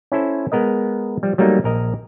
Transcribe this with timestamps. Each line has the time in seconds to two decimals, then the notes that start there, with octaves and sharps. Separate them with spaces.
0.12 C#4 E4 A4 C5
0.52 G#3 B3 A#4 D#5
1.23 F3 G3
1.38 F#3 G3 A3 A#3 D#4
1.64 A#1 A#4 D#5